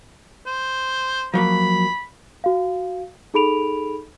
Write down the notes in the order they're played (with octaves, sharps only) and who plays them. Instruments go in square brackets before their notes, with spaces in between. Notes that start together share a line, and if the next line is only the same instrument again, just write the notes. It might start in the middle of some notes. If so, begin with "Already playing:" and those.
[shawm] C5
[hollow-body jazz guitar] F3 F#3 A#3 [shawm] B5
[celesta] F#4 F5
D#4 G#4 A4 B5 D7 F7